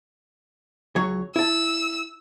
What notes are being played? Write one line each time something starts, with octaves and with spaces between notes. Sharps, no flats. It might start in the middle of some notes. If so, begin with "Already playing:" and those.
C#2 F#3 C#5
E4 A5 E6